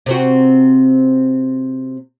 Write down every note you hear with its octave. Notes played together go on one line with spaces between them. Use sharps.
C3 C4 F#4